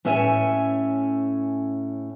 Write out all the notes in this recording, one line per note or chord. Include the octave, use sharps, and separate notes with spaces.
A2 C#4 C#5 E5 G5 G#5